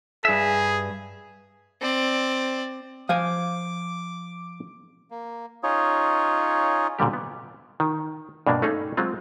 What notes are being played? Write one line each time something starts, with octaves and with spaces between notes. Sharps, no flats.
G2 G#4 E5
C4 D5
F3 C5 F5 G#5 D6
A#3
C#4 D#4 F4 G#4 C#5
A#2 D3 G3 G4
B3
D#3
G2 B2 A#3 D4
A3 C#4 D#4 G#4 C#5
F#3 G#3 C4 F4